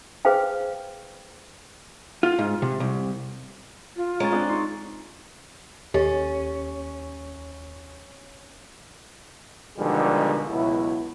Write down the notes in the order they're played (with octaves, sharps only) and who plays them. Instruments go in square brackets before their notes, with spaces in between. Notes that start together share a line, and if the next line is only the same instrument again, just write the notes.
[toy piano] G#4 B4 C5 F5 G5
[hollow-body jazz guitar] F4
G#2
C3
C2
[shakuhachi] F4
[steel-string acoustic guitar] G#3 [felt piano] C#4 [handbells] A#5 C#6 A6
[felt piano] C4 D4 G#4
[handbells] D#4 [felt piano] C6 C#6
[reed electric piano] D#2 [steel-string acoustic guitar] C#4 [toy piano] G4 A4 D#5
[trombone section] B2 D3 D#3 F3 G3 G#3
C#2 B2 F#3 E4